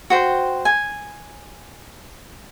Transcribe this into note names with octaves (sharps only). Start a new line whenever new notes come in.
F#4 C5 G5
G#5